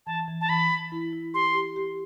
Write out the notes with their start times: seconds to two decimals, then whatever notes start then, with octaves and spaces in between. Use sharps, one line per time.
0.06 E3 A5
0.28 E3
0.41 A5
0.49 E3 B5
0.70 E3
0.92 E4
1.13 E4
1.34 G4 C6
1.55 G4
1.76 G4